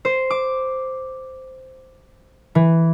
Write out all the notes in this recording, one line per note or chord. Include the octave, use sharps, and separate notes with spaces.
C5
D6
E3